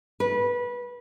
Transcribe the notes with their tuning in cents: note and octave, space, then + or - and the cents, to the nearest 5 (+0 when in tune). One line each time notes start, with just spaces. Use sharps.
B4 -20